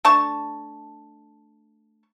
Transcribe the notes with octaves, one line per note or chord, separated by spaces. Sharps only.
A3 D4 A5 C#6